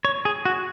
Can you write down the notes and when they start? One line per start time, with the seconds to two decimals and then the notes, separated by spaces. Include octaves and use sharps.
0.05 C#5
0.25 G#4
0.45 F#4